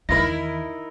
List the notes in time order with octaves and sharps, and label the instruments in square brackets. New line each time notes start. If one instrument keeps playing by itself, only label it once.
[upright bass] E2 D#3 [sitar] D#4 E4 A#4 [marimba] A#6